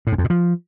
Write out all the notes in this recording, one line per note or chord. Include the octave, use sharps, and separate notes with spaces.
A2
G#2
F2
A#2
F3